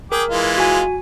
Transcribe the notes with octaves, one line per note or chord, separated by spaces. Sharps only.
G#4 A#4 G5 D6
E3 G#3 F4
F#4 G#5